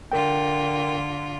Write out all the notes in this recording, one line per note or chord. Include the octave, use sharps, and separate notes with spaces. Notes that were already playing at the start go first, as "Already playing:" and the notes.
D3 F4 A#4 G5